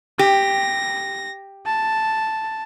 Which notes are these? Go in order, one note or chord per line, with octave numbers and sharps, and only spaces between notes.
G4 A#6
A5